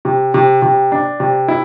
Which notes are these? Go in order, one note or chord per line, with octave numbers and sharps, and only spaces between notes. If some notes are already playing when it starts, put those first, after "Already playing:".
C3
C3
C3
D4
C3
E4